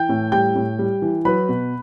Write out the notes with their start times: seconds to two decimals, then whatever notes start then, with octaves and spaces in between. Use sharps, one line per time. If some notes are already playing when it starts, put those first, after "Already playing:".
Already playing: E3 G5 G6
0.09 A2
0.32 G3 G5 G6
0.56 A2
0.79 G3
1.02 E3
1.25 F#3 B4 B5
1.49 B2